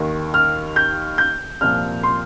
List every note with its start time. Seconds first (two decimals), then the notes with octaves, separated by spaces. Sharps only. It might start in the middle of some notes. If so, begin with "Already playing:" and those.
Already playing: D#2 D#3
0.34 F6
0.76 G6
1.18 G6
1.61 C2 A#2 F3 F6
2.03 C6